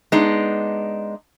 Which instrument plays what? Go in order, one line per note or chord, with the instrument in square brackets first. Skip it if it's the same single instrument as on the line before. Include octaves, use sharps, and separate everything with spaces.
[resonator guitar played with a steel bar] G#3 B3 D4 D#4